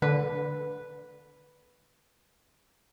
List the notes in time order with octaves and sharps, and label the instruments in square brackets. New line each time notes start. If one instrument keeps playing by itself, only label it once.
[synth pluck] D3 [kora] B4